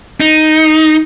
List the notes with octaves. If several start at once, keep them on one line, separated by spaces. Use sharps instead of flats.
D#4